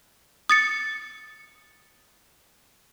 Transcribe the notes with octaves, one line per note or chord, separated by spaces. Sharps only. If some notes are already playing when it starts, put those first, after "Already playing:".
D#6 A6 C#7